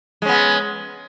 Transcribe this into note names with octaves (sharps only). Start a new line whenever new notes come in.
G#3 B3 C#4